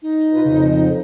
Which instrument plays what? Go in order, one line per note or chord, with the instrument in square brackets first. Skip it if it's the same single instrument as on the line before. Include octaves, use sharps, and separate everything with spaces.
[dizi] D#4
[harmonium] B2 F4 B4
[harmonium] F2 [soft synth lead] C#3